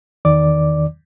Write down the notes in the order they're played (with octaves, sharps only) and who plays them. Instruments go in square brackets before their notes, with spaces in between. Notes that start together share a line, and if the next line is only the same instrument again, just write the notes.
[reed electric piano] E2 D#3 D5 D6